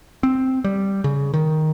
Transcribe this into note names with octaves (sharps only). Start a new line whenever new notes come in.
C4
G3
C#3
D#3